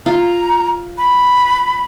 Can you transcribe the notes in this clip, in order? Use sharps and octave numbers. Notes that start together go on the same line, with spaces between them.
F4 A#5
B5